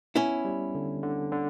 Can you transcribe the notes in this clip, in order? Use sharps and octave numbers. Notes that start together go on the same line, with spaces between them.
B3 C#4 E4
G3
D3
D3
D3